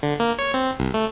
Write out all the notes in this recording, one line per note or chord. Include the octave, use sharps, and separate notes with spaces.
D3
A#3
C#5
C4
C2
A3